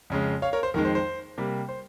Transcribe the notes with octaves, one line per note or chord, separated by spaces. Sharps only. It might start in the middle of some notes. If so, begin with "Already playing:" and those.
F2 C#3 G#3
C#5 F5
A#4 C#5
C5
F2 D#3 G#3 A#4
C5
C5
C3 G3 A#3
C5